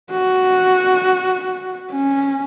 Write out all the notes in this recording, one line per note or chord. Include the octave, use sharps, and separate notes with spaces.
F#4
C#4